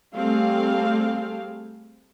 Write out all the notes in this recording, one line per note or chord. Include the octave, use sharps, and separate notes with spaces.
G3 A3 C4 G#4 A4 F5